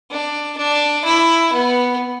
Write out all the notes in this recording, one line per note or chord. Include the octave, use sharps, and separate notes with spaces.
D4
D4
E4
B3